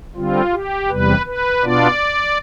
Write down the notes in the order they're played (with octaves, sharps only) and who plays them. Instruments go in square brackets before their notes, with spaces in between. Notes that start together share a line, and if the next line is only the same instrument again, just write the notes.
[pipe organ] D3 G3 C4 F4
G4
E2 C3 G3 B4
B4
B2 B3 D4 F4 D5